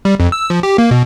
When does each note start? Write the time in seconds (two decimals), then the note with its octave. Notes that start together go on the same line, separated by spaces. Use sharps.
0.05 G3
0.20 F2
0.32 E6
0.50 F3
0.63 G4
0.78 A#3
0.91 B2